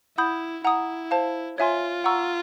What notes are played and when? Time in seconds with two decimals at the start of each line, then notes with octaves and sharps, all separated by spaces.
0.17 E4 F#5 B5 D#6 G6
0.64 E4 F#5 A#5 D#6
1.11 C5 F5 A5
1.58 F4 C#5 E5 G#5 C6
2.04 F#5 A#5 C#6 E6